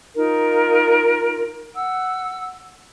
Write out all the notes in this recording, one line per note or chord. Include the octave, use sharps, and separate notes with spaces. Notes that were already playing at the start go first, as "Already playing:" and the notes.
D#4 F4 A#4
F#5 E6